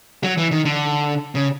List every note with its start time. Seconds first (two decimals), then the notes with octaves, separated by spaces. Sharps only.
0.23 F#3
0.37 E3
0.51 D#3
0.65 D3
1.35 C#3